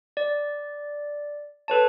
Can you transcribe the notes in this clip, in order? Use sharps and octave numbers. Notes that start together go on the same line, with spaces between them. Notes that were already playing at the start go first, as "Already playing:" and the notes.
D5
A4 B4 C#5 A5